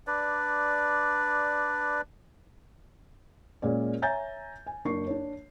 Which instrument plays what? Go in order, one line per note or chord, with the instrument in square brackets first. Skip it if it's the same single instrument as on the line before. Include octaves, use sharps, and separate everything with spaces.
[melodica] D4 B4 D5
[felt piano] A#2 G#3 C#4 D5
C#5 E5 G#5 A#5 G6 A6
G#5
F#1 D4 C#6 C7
D4 C#5